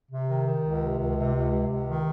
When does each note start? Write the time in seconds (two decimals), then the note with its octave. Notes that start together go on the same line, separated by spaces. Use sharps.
0.10 C3
0.28 D#3
0.46 D#3
0.63 C#2
0.81 C3
0.98 C#2
1.16 C3
1.33 C#2
1.51 C3
1.68 C#2
1.86 D#3